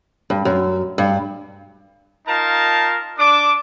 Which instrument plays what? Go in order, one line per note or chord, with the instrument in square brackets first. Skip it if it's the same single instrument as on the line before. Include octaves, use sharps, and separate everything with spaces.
[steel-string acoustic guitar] G2
F#2
G2
[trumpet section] D#4 F4 A#4 F5 A5
D4 D6